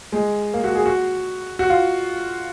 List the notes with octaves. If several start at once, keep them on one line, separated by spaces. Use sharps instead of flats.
G#3
A#3
F#4
G#4
F#4
F#4
F4